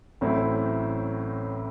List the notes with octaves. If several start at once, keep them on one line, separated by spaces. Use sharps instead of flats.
A1 A2 F#3 C4 E4